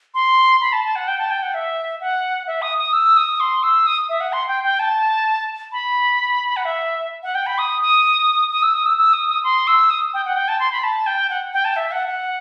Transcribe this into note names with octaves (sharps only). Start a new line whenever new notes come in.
C6
B5
A5
A5
F#5
G5
A5
G5
F#5
E5
F#5
E5
D#6
D#6
E6
D#6
C6
E6
D#6
E5
F#5
C6
G5
G5
A5
B5
F#5
E5
F#5
G5
B5
D#6
D#6
D#6
E6
D#6
E6
E6
D#6
D#6
C6
E6
D#6
G5
F#5
G5
A5
C6
B5
A5
G5
F#5
G5
A5
E5
F#5
F#5